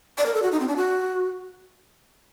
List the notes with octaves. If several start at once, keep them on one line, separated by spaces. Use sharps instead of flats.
D5
A#4
A4
F#4
D#4
C4
D4
F#4